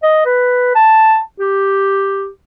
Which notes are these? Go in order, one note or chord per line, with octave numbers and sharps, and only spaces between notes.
D#5
B4
A5
G4